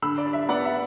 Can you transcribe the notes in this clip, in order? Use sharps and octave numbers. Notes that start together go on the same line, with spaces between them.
D3 B5 E6
D5
D4
E5
B3 D5 F#5
E5